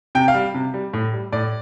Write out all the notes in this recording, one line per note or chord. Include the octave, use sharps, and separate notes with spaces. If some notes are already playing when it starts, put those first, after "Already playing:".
C3 G5
F5
G3
C3
G3
A2
G3
A2 D5